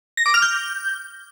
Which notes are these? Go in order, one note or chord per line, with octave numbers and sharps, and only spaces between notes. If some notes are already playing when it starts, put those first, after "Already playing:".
A#6
D6
F6
G6